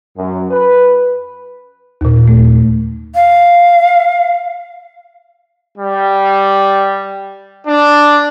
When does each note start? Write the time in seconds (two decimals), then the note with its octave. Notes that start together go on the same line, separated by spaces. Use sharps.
0.18 F#2
0.51 B4
2.01 D#2 A#2
2.28 A3
3.15 F5
5.77 G3
7.66 D4